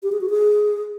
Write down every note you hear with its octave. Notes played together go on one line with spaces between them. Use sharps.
G4
G#4
F#4
G#4